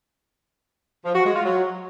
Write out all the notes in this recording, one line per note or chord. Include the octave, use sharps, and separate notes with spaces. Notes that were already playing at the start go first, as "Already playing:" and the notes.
F3
F#4
G#3
F4
F#3